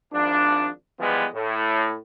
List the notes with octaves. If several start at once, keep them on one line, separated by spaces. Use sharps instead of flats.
G#1 F3 D4
E3 F3 G3 G#3 B3
A2